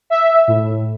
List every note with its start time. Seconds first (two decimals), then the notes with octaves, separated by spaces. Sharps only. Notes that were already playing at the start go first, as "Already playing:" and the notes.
0.10 E5
0.48 A2